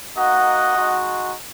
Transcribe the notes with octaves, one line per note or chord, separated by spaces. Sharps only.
A#3 D#4 F#4 D#5 F#5
G#3 D#4 F#4